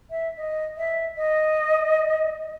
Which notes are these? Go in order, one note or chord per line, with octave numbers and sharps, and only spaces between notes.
E5
D#5
E5
D#5